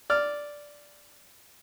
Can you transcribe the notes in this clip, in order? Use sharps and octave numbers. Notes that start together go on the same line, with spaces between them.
D5 F6